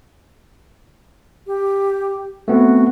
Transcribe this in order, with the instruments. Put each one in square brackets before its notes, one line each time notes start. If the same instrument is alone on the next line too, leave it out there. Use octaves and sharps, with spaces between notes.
[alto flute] G4
[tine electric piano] A3 B3 C4 [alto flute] F#4